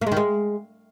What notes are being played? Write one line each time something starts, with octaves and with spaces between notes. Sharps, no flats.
A#3
G#3
D#3
G#3